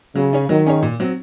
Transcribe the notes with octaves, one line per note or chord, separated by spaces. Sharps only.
C#3 F#3
C#4 G#4 C#5
D#3 F#3
C#4 G#4 C#5
A#2
F#3 C4